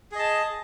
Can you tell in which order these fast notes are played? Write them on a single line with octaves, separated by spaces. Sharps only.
G#4 D#5 A5